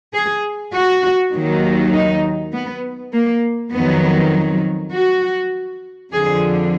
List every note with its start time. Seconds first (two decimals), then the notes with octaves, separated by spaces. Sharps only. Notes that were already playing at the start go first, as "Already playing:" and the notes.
0.13 G#4
0.74 F#4
1.33 D#2 D#3 F#3
1.93 D#4
2.53 B3
3.13 A#3
3.72 F2 D#3 F#3 B3
4.92 F#4
6.11 F2 D3 F3 G#4